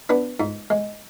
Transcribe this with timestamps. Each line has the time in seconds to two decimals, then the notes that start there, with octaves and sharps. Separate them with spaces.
0.09 B3 D4 B4
0.40 G#2
0.70 G#3